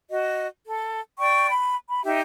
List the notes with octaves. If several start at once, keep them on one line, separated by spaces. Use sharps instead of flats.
F#4 D#5
A4
D5 G5 C#6
B5
B5
D#4 G4 E5